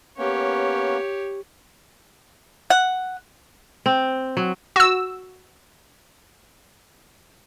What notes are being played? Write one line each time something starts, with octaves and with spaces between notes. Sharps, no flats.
A#3 B3 C#4 G4 C#5
F#5
C4
F#3
F#4 E6